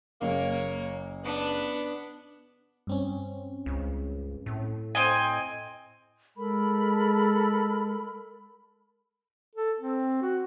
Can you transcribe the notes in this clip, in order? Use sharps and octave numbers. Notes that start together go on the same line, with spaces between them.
F#1 A#3 C#5
B3 D4
G2 C4 C#4
C#2
A2
C4 D#5 G#5
G#3 A4 A#4 B5
A4
C4
F#4